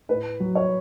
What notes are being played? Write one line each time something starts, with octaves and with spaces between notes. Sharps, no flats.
A2 B4
F#3
C#5